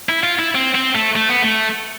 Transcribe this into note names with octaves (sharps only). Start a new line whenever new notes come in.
E4
F4
E4
C4
C4
A3
A3
B3
A3